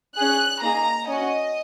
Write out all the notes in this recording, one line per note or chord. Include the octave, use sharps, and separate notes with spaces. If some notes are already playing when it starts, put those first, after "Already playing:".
C#4 G#4 F#6
A#3 D#4 G#4 A#5
C#4 F#4 D#5